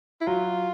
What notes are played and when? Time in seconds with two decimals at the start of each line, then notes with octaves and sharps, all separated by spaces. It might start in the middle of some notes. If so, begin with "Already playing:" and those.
0.21 E4
0.27 F#3 F4